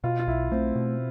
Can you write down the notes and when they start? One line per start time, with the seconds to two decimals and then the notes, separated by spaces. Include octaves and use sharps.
0.04 B2 F4
0.19 F4
0.27 B1 E4
0.51 A3 C4
0.75 B2